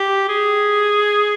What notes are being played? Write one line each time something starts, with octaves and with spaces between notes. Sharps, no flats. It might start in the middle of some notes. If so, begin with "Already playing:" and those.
Already playing: G4
G#4